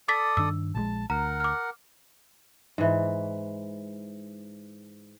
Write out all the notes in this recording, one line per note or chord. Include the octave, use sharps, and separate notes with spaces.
A4 D5 D6 D#6 A6 B6
G2 D#3 D4 E6
A#1 E3 G#3 A5
D2 A#4 F#5 A#5
D6 F6
G#2 E3